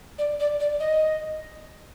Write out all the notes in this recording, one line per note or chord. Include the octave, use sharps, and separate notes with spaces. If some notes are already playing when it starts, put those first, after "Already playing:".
D5
D5
D5
D#5